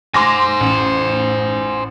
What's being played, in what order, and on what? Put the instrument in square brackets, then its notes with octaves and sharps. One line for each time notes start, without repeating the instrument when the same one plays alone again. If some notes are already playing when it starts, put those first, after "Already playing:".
[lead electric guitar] C5 G#5 [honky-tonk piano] C6 D6 A#6
[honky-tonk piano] A1